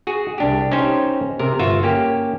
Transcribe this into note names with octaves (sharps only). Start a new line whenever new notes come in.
F#4 G#4
C2 D4 G4
C#4 D#4 G4 C5
C3 A#4
G1 F4 F#4 E5
A#3 C#4 G4